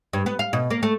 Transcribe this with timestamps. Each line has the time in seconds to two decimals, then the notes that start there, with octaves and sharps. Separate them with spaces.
0.13 G2
0.26 B3
0.39 F5
0.53 B2
0.70 A#3
0.83 A3